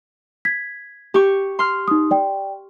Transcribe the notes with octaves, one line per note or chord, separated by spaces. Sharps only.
G#6 B6
G4 C#6
C6 F6
D#4 D#6
D5 G5